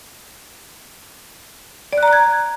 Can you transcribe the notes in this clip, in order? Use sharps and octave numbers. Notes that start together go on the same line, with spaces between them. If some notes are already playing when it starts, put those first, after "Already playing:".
D5
F#6
A#5
F#6
G#6